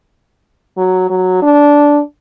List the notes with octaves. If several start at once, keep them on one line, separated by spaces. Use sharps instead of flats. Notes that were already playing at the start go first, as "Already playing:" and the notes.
F#3
F#3
D4